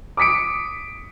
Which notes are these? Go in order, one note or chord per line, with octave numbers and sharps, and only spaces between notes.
D6 D#6 B6 C#7 D7